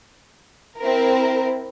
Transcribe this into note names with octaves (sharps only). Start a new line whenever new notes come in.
C4 E4 A#4